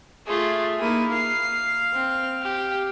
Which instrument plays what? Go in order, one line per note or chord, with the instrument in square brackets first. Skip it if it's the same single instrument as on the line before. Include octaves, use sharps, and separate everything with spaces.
[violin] A3 F4 [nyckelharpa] G#4
[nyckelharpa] A#3 D#4 [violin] E4 D#7
[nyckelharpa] F5 [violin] C7
[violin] C4
G4